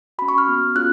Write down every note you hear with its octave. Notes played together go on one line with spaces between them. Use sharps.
C#4 F#4 B5
C#6
F6
B3 F#4
C#4 F4 G#4 F#6